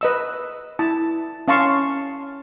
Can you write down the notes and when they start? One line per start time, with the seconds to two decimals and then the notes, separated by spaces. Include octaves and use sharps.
0.01 B4 D#5 E6
0.79 E4 A5
1.48 C#4 F5 A5 C6 C#6